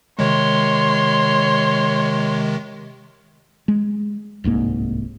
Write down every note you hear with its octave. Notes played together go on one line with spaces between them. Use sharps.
C3 D#3 G#3 C#5 C6
G#3
D1 C2 G#2 A#3